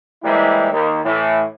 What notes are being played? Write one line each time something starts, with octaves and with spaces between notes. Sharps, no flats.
E3 G3 G#3 A#3 C4 E4
D#2
A2 E3